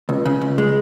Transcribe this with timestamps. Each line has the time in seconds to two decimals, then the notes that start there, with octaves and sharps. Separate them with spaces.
0.09 C#2
0.25 C#3
0.41 C#2
0.58 G#3